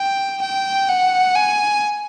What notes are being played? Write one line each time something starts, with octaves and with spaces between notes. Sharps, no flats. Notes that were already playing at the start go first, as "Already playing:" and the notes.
Already playing: G5
G5
F#5
G#5